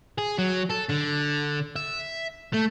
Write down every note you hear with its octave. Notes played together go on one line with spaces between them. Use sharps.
G#4
F#3
A4
D3
E5
A3